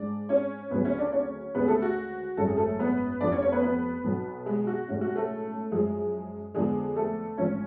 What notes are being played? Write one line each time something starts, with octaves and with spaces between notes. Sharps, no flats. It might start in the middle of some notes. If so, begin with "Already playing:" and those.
Already playing: G#2 G#3 D4 D5
C#4 C#5
D2 C#3 F#3 B3 B4
C#4 C#5
D4 D5
C#4 C#5
D2 C#3 G#3 B3 B4
G#4
A3 A4
F#4
G#1 F#2 C#3 G#3 C#4 A4
G#4
A3 A4
B3 B4
F1 F2 F3 D4 D5
C#4 C#5
C#4 C#5
B3 B4
B3 B4
B1 B2 F#3
G#3 G#4
F#4
B1 A2 G#3 C#4
F#4
A3 A4
F#2 F3 G#3 G#4
F2 D3 F3 G#3 B3 D4 G#4
A3 A4
A1 G#2 F3 C#4 C#5